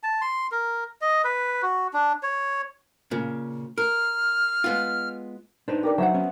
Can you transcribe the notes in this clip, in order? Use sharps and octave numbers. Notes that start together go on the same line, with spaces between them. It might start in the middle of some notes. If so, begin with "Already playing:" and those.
A5
C6
A#4
D#5
B4
F#4
D4
C#5
A#2 C#3
A#4 F6
G#3 B3 F4
D4 D#4 B4 C5
G4 A#4 D5
F#3 C5 E5 F#5
B3 C#4